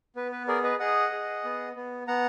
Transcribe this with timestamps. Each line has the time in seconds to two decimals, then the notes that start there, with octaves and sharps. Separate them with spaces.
0.16 B3 B4
0.32 B4
0.48 G#4 A#4 D5
0.63 B4 D#5
0.80 G#4 D#5 F#5
1.12 G#4
1.44 B3
1.76 B3
2.07 B3 F#5 A#5